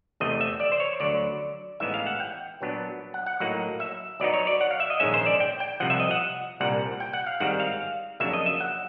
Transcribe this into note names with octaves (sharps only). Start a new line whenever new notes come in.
E2 C3 E3 A3 C4 D#5
E5
D5
C5
C#5
D2 D3 F#3 D5
A1 G#2 E3 G#3 B3 E5
F5
F#5
G5
A#2 F#3 B3 D4
F#5
F#5
A2 F#3 A#3 D#4 F#5
E5
B1 B2 F#3 B3 D#4 D5
C#5
D5
F#5
F5
E5
D#5
A#1 G#2 D#3 G#3 C#4 E5
C5
D5
G5
G5
C2 C3 F3 F#5
E5
D#5
F#5
C2 A#2 G3 F#5
G5
F#5
F5
G#2 D#3 G3 C4 F#5
F5
F2 C#3 F#3 A#3 D4 E5
D#5
E5
F#5